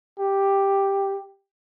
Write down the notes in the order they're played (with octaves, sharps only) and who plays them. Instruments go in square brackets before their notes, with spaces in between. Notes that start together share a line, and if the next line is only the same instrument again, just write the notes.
[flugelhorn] G4